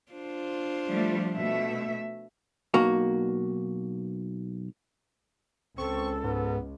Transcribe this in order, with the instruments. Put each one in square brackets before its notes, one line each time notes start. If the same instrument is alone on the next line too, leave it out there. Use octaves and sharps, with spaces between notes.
[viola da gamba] D4 F4 C5
[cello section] F3 G3 A3
B2 A3 E5
[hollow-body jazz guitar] B1 A#3 F#4
[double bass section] C#2 [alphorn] C4 [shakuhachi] A4 [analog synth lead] C#6
[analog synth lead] G#2 [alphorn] B3